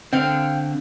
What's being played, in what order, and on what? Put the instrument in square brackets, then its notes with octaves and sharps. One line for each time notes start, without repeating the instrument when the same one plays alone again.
[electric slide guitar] D3 [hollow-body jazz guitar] C4 [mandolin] F5 G5